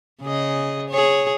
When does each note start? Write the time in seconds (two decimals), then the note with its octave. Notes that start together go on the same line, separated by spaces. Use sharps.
0.22 C#3 G#4 D#5
0.89 G#4 C#5